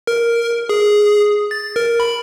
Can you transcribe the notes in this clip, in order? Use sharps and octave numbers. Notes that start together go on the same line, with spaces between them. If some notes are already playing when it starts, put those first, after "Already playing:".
A#4
G#4
A6
A#4
B5